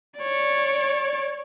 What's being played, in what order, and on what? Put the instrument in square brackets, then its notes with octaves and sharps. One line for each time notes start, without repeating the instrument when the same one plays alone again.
[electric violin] C#5 D5